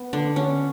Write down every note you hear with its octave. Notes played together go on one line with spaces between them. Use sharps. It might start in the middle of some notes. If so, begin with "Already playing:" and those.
Already playing: B3
D3 D4
C#4